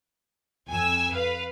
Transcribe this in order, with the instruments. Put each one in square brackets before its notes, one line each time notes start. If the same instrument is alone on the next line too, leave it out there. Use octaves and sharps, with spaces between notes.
[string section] F2 G#5 E6
B4 F5